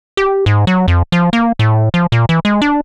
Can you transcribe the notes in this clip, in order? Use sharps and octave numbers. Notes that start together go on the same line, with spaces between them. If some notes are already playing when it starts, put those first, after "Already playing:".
G4
G#2
F#3
F2
F3
A#3
A2
F3
A#2
E3
G#3
D4